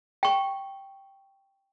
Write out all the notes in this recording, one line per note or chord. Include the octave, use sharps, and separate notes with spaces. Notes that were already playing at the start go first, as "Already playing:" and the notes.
G5 C#6